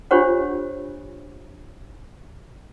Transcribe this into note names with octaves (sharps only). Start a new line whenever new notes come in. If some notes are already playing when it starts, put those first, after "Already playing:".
D4 F4 G4 C5 C#5 F#5